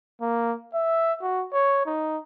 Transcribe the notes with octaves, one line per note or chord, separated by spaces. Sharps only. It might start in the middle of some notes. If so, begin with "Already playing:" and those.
A#3
E5
F#4
C#5
D#4